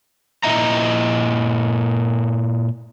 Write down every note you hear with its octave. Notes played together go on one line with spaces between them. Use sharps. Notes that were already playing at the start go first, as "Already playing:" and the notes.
A#2 G3 E4 D#5 E5 A#5